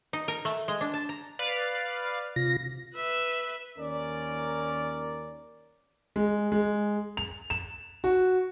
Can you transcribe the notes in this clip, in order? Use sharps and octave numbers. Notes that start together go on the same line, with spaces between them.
D#4
A#4
A3
G#3
D4
A5
A#5
B4 D5 F5
C3 F4 A#6
B4 E5
D#2 C#4 A#4 D5
G#3
G#3
F7
E7
F#4